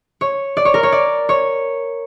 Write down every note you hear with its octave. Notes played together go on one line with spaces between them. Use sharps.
C#5
D5
C#5
A#4
C#5
D5
C#5